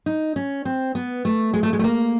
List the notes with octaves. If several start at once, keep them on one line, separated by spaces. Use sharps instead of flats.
D#4
C#4
C4
B3
A3
G#3
A3
G#3
A3
A#3